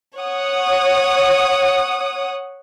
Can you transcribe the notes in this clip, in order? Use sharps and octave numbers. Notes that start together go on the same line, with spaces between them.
C#5 F#5 D#6